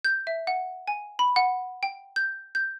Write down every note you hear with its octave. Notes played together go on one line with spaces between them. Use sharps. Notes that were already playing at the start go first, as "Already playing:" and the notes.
G6
E5
F#5
G#5
B5
F#5
G5
G6
G6